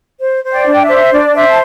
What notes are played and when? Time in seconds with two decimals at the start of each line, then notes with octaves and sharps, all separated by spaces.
0.21 C5
0.44 C5
0.51 D5 G5
0.66 D4
0.74 G5
0.82 E5
0.89 C5
1.12 D4 D5
1.34 C5 E5
1.49 A5